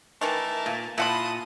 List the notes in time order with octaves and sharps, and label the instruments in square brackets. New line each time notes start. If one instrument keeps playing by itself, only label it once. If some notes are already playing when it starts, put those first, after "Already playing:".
[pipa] D#3 E3 A3 [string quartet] A#4 A5
[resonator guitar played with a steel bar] A#2
[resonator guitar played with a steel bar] A#2 [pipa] E4 F#5 B5 [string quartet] A5 C6 D#6